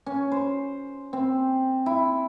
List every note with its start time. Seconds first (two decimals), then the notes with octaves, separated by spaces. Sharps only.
0.06 C#4
0.32 C5
1.13 C4
1.86 E4